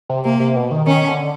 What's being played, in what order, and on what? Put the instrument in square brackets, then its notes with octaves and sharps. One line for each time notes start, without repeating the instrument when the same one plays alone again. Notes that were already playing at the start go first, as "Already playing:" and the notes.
[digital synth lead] C3
[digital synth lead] C3 [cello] A#3
[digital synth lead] C3
B2
D#3
[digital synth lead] D#3 [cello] C#4
[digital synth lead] D3